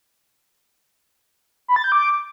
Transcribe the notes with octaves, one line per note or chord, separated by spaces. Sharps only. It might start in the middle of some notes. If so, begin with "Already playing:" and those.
B5
A6
G6
D6